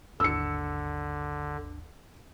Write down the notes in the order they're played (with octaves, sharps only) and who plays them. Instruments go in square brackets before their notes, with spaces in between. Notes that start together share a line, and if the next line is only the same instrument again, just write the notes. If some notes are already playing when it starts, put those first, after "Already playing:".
[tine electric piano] G#1 D#2 D4 [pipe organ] D3 [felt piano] E6 C#7